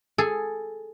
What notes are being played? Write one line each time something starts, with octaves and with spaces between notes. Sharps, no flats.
G#4 A4